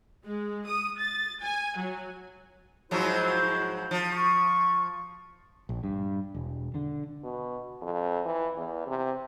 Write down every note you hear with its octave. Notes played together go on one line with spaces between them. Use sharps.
G#3
D#6
A6
G#5
F#3
G#2 F3 F#3 E4 F#4 C5
F3
C#6
A#1
G2
E1
D3
B2
F2
E3
E2
C3